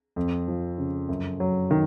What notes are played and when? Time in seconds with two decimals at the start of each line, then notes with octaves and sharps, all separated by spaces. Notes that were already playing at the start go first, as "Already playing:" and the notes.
0.16 F2
0.48 F3
0.78 C#3
1.09 F#2
1.40 F#3
1.71 D#3